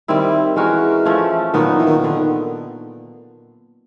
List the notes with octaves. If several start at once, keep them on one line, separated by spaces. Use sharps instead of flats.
D#3 G3 C4 E4
E3 G#3 C#4 F#4 A#4
F3 A3 C#4
A#2 D#3 F#3 B3 D#4
E3
D#3
D3 D#3